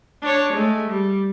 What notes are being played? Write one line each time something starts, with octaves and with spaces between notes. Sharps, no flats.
D4 C#5
G#3 A3
G3